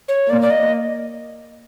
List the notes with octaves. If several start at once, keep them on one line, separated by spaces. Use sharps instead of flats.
C#5
A#3 D5
D5
D#5